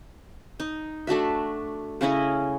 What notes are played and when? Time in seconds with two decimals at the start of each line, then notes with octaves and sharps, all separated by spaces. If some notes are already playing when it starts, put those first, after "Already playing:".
0.60 D#4
1.07 A3 D4 F#4 E5
2.01 C#3 C#4 E4 D#5